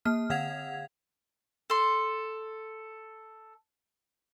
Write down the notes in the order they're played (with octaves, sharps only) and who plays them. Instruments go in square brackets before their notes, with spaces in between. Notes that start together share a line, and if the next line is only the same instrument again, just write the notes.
[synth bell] A#3 F6
D3 F5 F#5 G#6 F7
[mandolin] A4 C6